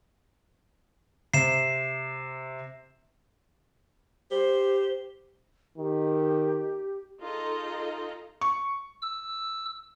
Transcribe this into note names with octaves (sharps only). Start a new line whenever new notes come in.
C3 C7 E7
G4 C5
D#3 G4
D#4 F4 G#4 A4 D#5 A#5
C#6
E6